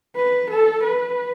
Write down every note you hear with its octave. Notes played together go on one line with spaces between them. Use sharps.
B4
A4
B4